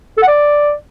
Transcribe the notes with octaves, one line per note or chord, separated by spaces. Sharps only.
A4
F#5
D5